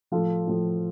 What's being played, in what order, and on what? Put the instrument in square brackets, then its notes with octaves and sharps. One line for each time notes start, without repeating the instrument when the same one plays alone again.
[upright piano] A2 F3 F4 A4
A2 F3